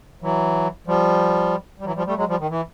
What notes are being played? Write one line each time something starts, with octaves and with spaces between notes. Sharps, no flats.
E3 F#3
F3 G3
G3
E3 F#3
F3 G3
G3 A3
F#3 G#3
F3 G3
D#3
E3